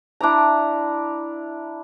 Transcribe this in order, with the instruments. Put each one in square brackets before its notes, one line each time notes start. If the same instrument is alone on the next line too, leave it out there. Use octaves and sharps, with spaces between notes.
[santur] D4 E4 D5 A#5